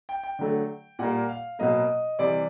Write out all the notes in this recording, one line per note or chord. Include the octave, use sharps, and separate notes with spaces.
G5
G5
D3 F#3 A3
A#2 G3 A#3 F#5
F5
B2 F#3 A#3 D#5
C3 E3 G3 D5